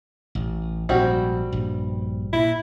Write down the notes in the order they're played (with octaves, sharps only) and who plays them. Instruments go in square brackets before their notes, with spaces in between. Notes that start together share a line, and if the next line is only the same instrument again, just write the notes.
[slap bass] A1
[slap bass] A#1 G#2 F3 [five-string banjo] G3 C4 F#4
[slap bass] A#1 G2
[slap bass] A#2 [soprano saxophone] E4